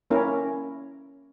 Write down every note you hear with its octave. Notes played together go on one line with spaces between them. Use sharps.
A#3 C#4 E4 A#4